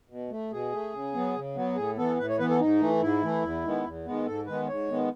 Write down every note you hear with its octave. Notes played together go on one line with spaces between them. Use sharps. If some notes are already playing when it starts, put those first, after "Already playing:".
B2
A3
B2 G#4
A3
C#3
F#3 B3
C#3
F#3 B3
A2 G#4
E3 B3 A4
A2 B4
C#5
E3 B3 B4
A4
G#2 D#4
E3 A3
G#2 E4
E3 A3
E2
D#3 G#3 B3
E2
D#3 G#3 B3
G#2 A4
D#3 G#3 B3 B4
G#2 C#5
D#3 G#3 B3